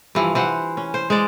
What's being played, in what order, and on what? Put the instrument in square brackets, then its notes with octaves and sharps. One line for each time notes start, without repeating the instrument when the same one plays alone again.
[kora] G2 E3 F3
E3 C5 F#5
C#4
C5
G#3 C5 D5